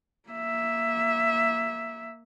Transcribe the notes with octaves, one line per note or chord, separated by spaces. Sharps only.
A#3 E5